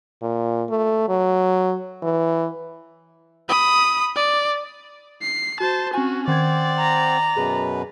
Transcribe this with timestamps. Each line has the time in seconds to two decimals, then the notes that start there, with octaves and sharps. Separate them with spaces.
0.22 A#2
0.69 A3
1.09 F#3
2.03 E3
3.49 B5 D#6
4.16 D5
5.22 C7
5.60 F#4 C5 A5
5.93 C4 C#4 F#4 G#5
6.28 D#3 C4 C5 D5 F#5 G#6
6.79 A#5
7.36 F#2 B2 G#4 B4